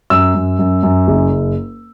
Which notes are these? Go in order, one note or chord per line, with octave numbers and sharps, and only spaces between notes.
F#2 E6
F#2
F#2
F#2
F#1